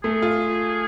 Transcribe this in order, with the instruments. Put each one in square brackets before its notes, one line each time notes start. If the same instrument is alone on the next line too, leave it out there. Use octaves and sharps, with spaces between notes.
[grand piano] A3 [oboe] G#4
[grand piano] F4